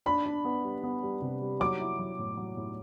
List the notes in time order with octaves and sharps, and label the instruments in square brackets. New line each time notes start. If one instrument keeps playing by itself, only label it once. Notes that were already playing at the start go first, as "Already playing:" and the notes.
[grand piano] D4 [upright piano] B5
[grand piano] D4
B3
G3
B3
G3
C3
G3
[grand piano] F#3 [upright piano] D6
[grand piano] E4
F#3
A2
F#3
A2